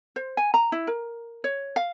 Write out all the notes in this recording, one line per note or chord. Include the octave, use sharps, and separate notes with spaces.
C5
G#5
A#5
E4
A#4
C#5
F5